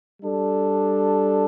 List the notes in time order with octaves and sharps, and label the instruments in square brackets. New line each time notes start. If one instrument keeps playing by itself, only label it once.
[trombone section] G3 D4 A4